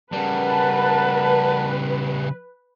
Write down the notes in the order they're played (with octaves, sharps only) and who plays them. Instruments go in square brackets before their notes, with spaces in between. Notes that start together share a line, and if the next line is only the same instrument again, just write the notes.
[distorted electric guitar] C#3 G3 [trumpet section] A#4 F#5 A5 [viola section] B4